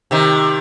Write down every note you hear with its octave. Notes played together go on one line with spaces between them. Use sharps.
C3 D#3